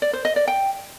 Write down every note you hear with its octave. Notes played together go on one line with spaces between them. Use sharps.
D5
C5
D#5
D5
G5